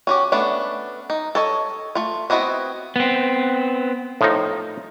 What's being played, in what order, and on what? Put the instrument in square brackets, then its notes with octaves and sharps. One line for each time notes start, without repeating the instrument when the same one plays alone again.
[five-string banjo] C#4 F#4 G4
A3 B3 C#4 D4
D#4
A4 C#5 D#5
A3 F4
B3 C4 E4 F#4 D#5
[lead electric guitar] B3 C4
[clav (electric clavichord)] A2 F3 D#4